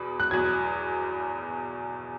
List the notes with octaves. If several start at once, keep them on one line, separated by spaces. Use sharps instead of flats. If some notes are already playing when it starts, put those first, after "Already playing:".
Already playing: E2 B2 B5
F#6
E2 B2 F#3 G#6